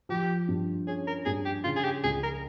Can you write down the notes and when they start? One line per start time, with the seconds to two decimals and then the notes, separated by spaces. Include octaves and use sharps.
0.09 F3 G4
0.48 G2
0.87 C#4 G#4
1.07 A#4
1.25 G2 G#4
1.46 G4
1.64 C#3 F4
1.76 G#4
1.84 G4
2.04 C#2 G#4
2.23 A#4